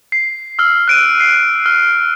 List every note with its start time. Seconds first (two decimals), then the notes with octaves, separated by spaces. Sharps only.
0.12 C7
0.59 E6 F6
0.88 F#6 D7 D#7
1.20 C7
1.66 F6